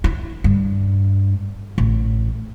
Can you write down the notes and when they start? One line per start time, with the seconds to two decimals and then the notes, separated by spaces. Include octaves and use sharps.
0.04 E4
0.44 G2
1.78 A1